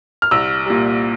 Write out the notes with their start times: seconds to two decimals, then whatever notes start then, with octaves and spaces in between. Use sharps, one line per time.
0.22 F6
0.31 C2 E6
0.66 A#2 G3